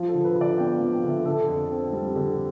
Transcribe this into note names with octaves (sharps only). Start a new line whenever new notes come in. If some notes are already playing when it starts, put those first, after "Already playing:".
Already playing: F3 F4
A4
D3
B4
D3
D5
B3 G5
F5
F3
G5
D3
E5
D3 A4
F2
C4
G3
D3